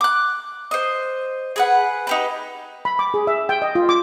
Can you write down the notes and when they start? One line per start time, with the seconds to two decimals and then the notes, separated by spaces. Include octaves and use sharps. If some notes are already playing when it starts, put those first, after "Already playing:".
0.01 D6 F#6
0.71 C5 D#5
1.56 G#4 B4 F#5
2.07 D#4 G4 B4
2.85 B5
2.99 D6
3.14 G#4
3.27 E5
3.49 G5
3.62 D#5
3.75 F4
3.89 D6